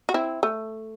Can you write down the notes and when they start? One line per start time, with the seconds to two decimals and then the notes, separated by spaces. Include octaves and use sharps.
0.09 F#4
0.14 C4 E4
0.43 A3